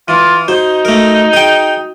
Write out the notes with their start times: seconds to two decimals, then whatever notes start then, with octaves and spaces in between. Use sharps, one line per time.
0.08 E3 F4
0.48 D#4 F#4 C5
0.85 A3 A#4
1.33 G#4 G5